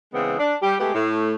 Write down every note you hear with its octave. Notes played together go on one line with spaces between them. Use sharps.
C#3 E3 G#3 B3 C4
D4
G3 G4
G#3 A3 B3 G4
A2 A3